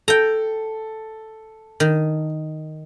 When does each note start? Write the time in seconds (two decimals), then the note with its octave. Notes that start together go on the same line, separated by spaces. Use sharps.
0.08 A4 G5 A#5
1.80 D#3